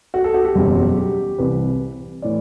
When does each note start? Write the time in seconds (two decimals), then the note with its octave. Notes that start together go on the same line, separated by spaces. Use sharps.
0.14 F#4
0.24 A4
0.34 F#4
0.45 G4
0.55 F#1 E2 B2 F#3
0.97 G4
1.38 C2 C3 E3 B4
2.22 A2 E3 D5